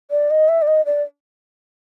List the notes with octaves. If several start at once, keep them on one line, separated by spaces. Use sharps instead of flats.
D5
D#5
E5
D5
D#5
D5